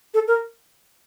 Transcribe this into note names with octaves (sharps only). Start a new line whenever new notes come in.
A4
A#4